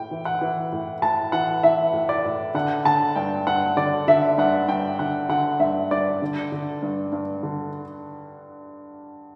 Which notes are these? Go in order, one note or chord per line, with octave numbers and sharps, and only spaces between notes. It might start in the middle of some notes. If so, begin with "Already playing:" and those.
Already playing: A2 G5
E3
F#5
E3
A2
A2 A5
E3 F#5
E3 E5
A2
D5
A2
D3 F#5
D3 A5
G2 G5
G2 F#5
D3 D5
D3 E5
G2 F#5
G2 G5
D3 F#5
D3 F#5
G2 E5
G2 D5
D3
D3
G2
G2
D3